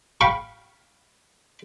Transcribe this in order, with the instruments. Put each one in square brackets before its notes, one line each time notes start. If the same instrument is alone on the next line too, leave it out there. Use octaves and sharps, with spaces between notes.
[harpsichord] F5 G5 B5 C#6